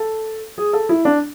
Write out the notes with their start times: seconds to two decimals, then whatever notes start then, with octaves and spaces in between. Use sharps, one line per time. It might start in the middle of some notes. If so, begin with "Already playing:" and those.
Already playing: A4
0.58 G#4
0.73 A4
0.89 E4
1.05 D4